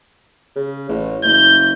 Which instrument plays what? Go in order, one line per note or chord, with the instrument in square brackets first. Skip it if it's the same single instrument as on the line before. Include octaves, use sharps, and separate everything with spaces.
[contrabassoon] C#3
A1
[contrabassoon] F#1 [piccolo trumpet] G6